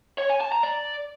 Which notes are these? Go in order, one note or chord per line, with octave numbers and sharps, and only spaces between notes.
C#5
G#5
A5
A#5
D5